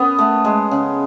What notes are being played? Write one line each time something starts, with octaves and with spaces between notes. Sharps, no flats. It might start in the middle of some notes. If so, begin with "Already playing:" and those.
Already playing: B3 C#4
A3
G#3
C#3